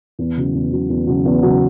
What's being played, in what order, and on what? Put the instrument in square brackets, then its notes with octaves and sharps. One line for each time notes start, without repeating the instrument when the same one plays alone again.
[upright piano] E2
C#3 F#3
E2
C#3 F#3
E2
C#3 F#3
E2
C#3 F#3